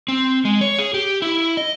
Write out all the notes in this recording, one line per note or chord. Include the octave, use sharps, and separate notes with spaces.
C4
G#3
C#5
G#4
G4
E4
D#5